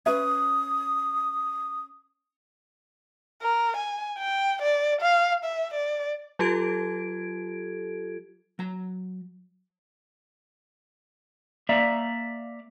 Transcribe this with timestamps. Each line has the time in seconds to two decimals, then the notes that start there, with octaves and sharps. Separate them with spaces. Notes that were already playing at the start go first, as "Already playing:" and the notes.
0.06 C#4 B4 E5 D#6
3.42 A#4
3.77 G#5
4.18 G5
4.62 D5
5.01 F5
5.45 E5
5.74 D5
6.39 F#3 F4 G4 A4 G#6 D7
8.59 F#3 A#5
11.69 A#3 D5 E5 F5 A#5